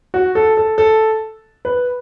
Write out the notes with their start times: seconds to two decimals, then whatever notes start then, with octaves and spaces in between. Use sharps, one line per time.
0.14 F#4
0.35 A4
0.57 A4
0.78 A4
1.65 B4